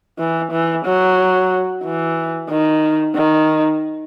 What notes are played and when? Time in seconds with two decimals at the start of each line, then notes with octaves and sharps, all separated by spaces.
0.19 E3
0.52 E3
0.85 F#3
1.83 E3
2.50 D#3
3.15 D#3